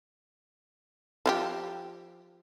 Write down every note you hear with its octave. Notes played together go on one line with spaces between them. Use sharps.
F3 E4 G4